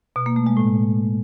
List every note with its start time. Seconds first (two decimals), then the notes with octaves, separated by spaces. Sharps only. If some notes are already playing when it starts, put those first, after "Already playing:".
0.16 B2
0.26 A#3
0.36 A3
0.47 G#3
0.57 A2